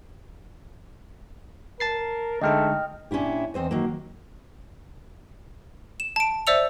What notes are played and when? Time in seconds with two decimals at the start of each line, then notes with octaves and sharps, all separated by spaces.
1.80 A#4 A5 A6 C7
2.42 D3 G#3 A3 D#4 D#5 G5 F6
3.11 A#2 C#4 D4 E4 G4
3.54 E2 C4 C5 D#5
3.71 D#3 F#3 A#3
6.00 E7
6.16 A5 D7
6.47 C5 D5 E5 E6 C#7 F7